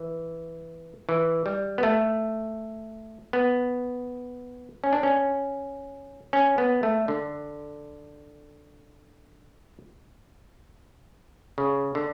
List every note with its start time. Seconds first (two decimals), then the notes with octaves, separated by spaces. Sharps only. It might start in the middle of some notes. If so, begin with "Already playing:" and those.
Already playing: E3
1.09 E3
1.46 G3
1.78 B3
1.83 A3
3.33 B3
4.84 C#4
4.93 D4
5.03 C#4
6.33 C#4
6.58 B3
6.83 A3
7.08 D3
11.58 C#3
11.95 D3